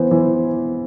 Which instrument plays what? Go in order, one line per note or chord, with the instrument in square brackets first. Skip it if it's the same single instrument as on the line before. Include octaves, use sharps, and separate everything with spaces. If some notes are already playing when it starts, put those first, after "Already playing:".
Already playing: [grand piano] E3 B3 C5
E3